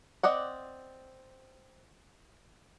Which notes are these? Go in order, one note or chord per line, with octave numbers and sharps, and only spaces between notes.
C4 D5 D#5 F#5